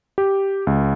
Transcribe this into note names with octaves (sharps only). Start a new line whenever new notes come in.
G4
C#2